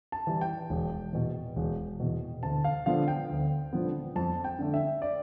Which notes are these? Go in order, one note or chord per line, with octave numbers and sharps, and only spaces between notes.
A5
E3 G3
G5
E1
E2 B2
E1
E2 B2
D2 A5
F5
D3 F3 B3 F5
G5
D2
D3 F3 B3
F2 A5
G5
D3 A3
E5
D5